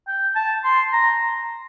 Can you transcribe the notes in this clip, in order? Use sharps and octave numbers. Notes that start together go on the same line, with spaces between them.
G5
A5
C6
A#5